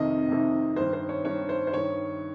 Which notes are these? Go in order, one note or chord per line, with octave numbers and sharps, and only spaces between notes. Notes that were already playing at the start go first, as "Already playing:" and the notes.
Already playing: F2 C3 D#3 D#5
F2 C3 D#3
G2 D#3 C5
C5
C#5
G2 D#3 C#5
C5
C5
G2 D#3 C#5